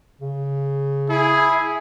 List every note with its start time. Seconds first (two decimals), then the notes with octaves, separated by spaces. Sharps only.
0.21 C#3
1.10 E4 G#4